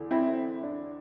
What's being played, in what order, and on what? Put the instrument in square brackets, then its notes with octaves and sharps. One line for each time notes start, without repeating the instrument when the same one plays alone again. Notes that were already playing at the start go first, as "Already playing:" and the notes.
Already playing: [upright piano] E2 D3
C4 E4
D4